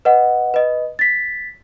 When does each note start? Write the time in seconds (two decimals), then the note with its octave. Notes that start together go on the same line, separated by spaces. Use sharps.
0.05 B4 D#5 F#5
0.54 B4 D#5
0.99 A6 B6